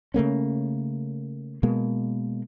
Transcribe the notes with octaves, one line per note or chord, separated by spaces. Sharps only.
C#3 A3 A#3 C#4
B2 G#3 A#3